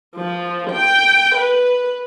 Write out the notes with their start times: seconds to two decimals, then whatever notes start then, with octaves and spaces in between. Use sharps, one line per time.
0.18 F3
0.74 G5
1.37 B4